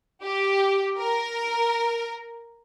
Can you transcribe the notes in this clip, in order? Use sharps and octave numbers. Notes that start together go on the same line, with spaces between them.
G4
A#4